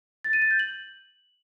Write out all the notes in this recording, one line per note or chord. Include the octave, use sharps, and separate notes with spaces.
A6
D#7
A6
G6
F#7